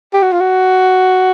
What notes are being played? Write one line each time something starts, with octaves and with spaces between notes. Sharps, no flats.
G4
F#4
F4
F#4